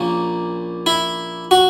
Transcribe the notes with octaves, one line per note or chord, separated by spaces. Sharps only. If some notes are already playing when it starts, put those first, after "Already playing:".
Already playing: A#1 A#2 A#3 C#4
E4
F#4